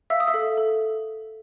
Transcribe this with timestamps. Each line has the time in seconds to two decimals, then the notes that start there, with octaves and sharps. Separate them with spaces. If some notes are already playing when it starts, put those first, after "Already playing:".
0.10 E5 F5 E6
0.20 D#6
0.27 E5 E6
0.34 A4
0.57 A4